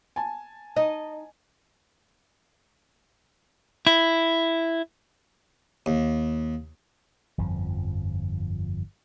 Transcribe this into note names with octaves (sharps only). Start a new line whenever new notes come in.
G#5 A5
D#4 D#5
E4
D#2
G1 F2 F3